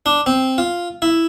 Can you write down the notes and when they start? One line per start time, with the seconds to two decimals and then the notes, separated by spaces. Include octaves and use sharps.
0.06 D4
0.26 C4
0.58 F4
1.02 E4